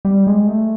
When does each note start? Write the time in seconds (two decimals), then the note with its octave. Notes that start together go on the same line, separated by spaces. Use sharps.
0.05 G3
0.27 G#3
0.47 A3